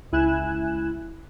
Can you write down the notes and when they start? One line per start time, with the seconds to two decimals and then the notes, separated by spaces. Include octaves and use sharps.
0.12 C#2 E4 G#5 F#6 G#6 E7